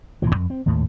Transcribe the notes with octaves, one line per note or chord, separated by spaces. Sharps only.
E1 A#2 E3 F3
F2
C4
G#1 D#2 A2 A3